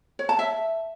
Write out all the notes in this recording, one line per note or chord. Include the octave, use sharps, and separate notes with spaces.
C#5
A5
E5